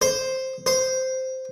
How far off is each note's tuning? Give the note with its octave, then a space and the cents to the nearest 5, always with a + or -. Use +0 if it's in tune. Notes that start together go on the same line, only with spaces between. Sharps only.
C5 +5
C5 -5